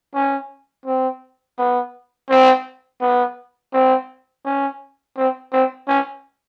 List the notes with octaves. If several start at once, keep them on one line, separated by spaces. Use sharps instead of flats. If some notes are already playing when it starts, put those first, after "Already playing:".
C#4
C4
B3
C4
B3
C4
C#4
C4
C4
C#4